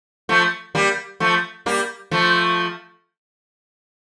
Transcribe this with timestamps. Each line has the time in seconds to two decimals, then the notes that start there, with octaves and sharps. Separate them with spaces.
0.29 F3 A3
0.75 G3 A#3
1.20 F3 A3
1.66 G3 A#3
2.11 F3 A3